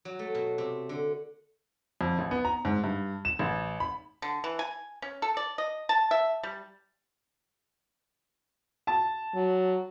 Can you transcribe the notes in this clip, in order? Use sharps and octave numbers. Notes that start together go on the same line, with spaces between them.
F#3
A3
B2
C3
D3
F2
A1
B3
A#5
G#2
G2
E7
A1
B5
D3
E3
G#5
C#4
A4
D5
D#5
A5
E5
G3
A5
F#3